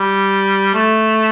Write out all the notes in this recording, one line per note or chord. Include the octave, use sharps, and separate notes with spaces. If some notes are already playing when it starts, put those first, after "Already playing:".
Already playing: G3
A3